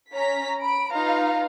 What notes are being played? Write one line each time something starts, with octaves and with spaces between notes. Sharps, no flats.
C#4 A#5 B6
B5 D7
D#4 F4 B4 F5 A#5